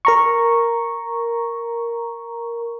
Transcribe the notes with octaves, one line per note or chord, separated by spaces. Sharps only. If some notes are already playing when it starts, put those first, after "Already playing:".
A#4 A#5 C#6